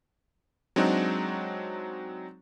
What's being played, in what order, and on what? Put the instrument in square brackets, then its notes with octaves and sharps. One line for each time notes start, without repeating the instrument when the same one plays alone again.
[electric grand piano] F#3 G#3 C4 D4 D#4 F#4